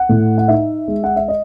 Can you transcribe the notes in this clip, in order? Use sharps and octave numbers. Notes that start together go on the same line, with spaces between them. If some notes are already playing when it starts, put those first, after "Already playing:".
Already playing: F#5
A2
F#5
D#4 E5
G#3
F#5
E5
D#5